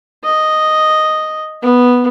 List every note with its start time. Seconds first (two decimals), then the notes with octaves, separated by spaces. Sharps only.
0.25 D#5
1.63 B3